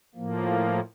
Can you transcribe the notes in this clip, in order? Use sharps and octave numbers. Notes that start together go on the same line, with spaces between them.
A2 F3 A#3